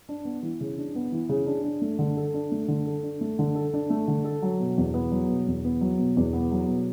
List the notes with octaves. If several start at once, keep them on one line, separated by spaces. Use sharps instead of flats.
D4
B3
E3
C#3
D4
B3
E3
C#3
D4
D4
A3
D3
A4
D4
A3
D3
A4
D4
A3
D3
A4
D4
A3
D3
A4
F#3
B2
E2
B3
F#3
B2
E2
B3
F#3
B2
E2
B3
F#3
B2